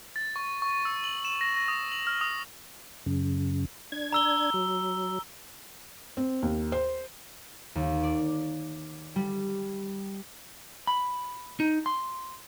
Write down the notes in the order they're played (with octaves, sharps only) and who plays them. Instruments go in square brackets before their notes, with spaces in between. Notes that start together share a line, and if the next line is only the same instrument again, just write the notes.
[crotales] A6
C#6
C#6
E6
F#7
E7
A#6
A#6
D#6
F#7
F6
D#6
[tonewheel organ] F#2 C#3
D4 G#6
[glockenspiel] A#5 E6 G7
[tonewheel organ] F#3
[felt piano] C4
D#2
C5
[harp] D#2
D5
G3
[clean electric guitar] B5
D#4
C6